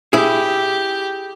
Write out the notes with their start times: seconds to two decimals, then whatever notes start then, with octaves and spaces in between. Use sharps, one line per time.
0.13 E4 G4 G#4